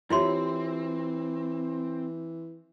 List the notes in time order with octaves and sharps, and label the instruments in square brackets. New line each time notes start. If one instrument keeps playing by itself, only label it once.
[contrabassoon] E3 [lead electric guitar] C4 [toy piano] E4 F4 C6 [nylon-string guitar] G4 C#5 E5